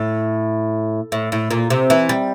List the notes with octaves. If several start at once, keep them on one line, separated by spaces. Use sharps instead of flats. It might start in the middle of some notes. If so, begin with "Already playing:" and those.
Already playing: A2
A2
A2
A#2
C3
E3
G3